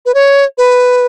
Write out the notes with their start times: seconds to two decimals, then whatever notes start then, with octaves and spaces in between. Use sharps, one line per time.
0.06 B4
0.14 C#5
0.58 B4